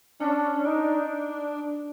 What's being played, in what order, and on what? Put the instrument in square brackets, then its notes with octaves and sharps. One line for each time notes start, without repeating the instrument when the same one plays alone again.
[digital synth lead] C#4 [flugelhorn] D4
[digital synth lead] D4 [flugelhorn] D#4